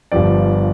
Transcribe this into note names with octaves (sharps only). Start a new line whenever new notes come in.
G1 G2 F3 D5